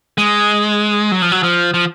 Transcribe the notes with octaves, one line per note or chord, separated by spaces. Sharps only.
G#3
F#3
F3
F#3
F3
F3